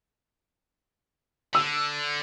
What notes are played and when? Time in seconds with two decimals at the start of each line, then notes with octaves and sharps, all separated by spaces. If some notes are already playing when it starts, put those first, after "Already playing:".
1.55 D3 E6